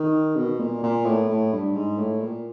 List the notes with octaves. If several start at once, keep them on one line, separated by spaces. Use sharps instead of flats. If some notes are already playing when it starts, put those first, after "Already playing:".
Already playing: D#3
B2
A#2
A#2
A2
A2
G2
G#2
A2
A#2